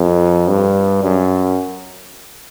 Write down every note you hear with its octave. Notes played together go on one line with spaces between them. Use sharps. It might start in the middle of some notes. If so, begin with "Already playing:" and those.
Already playing: F2
G2
F#2